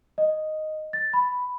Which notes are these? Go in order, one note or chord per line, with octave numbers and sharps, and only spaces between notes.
D#5
A6
B5